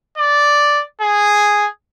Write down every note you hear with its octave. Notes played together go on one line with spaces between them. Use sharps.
D5
G#4